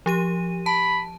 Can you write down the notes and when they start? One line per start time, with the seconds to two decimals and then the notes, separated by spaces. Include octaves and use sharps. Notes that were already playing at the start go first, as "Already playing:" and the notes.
0.06 F3 G4 D#7
0.66 A5 B5